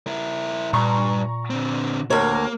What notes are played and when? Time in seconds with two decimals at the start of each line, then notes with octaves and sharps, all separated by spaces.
0.07 E4 A#4
0.73 G2 A#2 A#5 C#6
1.50 D3 C4
2.10 D2 A#3 A#4 C#5